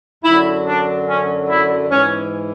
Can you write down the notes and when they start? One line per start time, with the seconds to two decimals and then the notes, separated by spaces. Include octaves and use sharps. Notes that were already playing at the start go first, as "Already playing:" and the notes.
0.23 F#2 D3 F#3 E4
0.65 D4
1.07 C#4
1.48 E4
1.90 G#2 E3 C#4